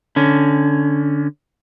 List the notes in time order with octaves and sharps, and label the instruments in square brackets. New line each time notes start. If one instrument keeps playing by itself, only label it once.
[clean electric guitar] D3 C#4